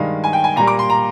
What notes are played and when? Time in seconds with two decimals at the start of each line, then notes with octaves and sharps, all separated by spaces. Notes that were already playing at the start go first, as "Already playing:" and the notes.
Already playing: G2 D#3 G#3 F5
0.24 G#5
0.33 G5
0.44 G#5
0.56 A#2 G3 A#3 A#5
0.67 D6
0.79 C6
0.90 A#5